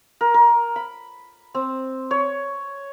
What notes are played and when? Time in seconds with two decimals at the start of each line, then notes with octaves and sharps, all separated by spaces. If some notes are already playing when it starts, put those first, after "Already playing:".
0.21 A#4
0.34 A#4
0.76 B5
1.55 C4
2.11 C#5